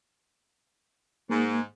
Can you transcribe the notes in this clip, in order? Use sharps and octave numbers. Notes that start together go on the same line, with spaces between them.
G#2 A#3